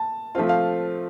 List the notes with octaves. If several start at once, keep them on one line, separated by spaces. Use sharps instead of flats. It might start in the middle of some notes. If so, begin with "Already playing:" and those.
Already playing: A5
F3 A3 C4 F4 F5
F5